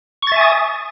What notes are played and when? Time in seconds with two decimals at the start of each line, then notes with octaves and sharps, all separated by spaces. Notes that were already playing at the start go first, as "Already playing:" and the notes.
0.23 C#6
0.27 A6
0.32 E5
0.36 G#5
0.41 D#6